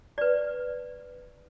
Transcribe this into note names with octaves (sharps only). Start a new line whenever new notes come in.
B4 D5